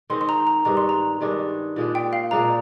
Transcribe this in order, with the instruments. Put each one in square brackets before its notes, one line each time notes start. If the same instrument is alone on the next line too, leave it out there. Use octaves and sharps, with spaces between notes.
[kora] D#3 G#3 C4 [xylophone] C6
[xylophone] C6
A#5
A#5
[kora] G2 D#3 G#3 D4 [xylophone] A#5
[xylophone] C6
A#5
[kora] G2 D#3 G#3 D4
A#2 G#3 D4
[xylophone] G5
F5
[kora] A#2 G#3 D4 [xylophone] A#5